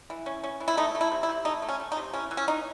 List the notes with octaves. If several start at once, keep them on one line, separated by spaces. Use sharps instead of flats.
E3
C#4
C#4
E3
E4
A3 D#4
A3
E4
C3
E4
C3
A3 D#4
A3
C#4
A3
D#4
C3
E3 C#4
E3
C#4
C#4 D#4